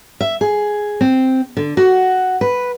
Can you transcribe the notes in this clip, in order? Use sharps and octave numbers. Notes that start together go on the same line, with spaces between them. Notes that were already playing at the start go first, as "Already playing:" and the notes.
E5
G#4
C4
D3
F#4
B4